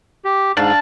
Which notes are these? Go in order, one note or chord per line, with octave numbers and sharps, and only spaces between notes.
G4
G#2 D4 F5